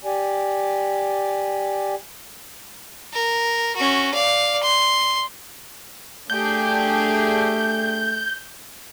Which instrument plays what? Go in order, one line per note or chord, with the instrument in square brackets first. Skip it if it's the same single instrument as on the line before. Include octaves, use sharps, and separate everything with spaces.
[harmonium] G4 D5 G#5
[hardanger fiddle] A#4
C#4 F#4
D5 F5
C6
[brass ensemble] A3 [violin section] D4 G4 G#4 [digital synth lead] G6